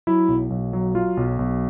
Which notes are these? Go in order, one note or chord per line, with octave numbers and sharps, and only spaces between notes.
F#3 E4
B1
B1
F#3
F#3 F4
B1
B1